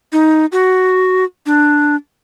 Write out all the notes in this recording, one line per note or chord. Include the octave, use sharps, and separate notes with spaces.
D#4
F#4
D4